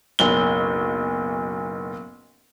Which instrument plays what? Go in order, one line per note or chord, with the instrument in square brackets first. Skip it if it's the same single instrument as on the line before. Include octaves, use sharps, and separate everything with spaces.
[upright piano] F#1 B1 G7